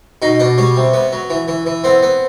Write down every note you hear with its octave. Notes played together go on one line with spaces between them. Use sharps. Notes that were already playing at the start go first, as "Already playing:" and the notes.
B2 D#4
B2 D4
G3 C#4
C3
B3
F#3
E3
E3
E3
B3 C4
B3